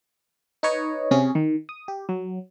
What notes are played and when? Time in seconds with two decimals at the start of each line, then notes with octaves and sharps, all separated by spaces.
0.63 D#4 B4 C#5 D#5
1.11 C3 C#4 G#4
1.35 D#3
1.69 D#6
1.88 G4
2.09 F#3